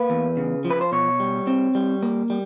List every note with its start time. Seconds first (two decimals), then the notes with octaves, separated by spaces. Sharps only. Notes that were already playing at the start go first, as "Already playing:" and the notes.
Already playing: A#3 B4
0.10 E2
0.37 C#3
0.65 F3
0.70 B4
0.81 C5
0.92 B2 C#5
1.20 G3
1.47 C4
1.75 G3
2.03 A#3
2.30 G3